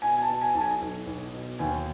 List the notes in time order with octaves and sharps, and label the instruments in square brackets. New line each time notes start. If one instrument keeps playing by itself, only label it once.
[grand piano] B2 G#5
G#5
A5
B2
G#5
B1 A5
G#5
B1
B1
B2
D#2 G#5